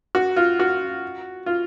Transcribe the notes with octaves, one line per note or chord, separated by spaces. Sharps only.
F#4
F4
F#4
F4